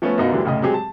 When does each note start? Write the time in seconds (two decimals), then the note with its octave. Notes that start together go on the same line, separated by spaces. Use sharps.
0.02 F3 A3 B3 C#4
0.18 F#2 B2 B3 D#4 F4 F#4
0.32 D2 D3 E3 F#3 G3
0.44 F1 A2 C#3 D#5
0.62 F#3 G#3 C4 G4 G#4
0.74 A5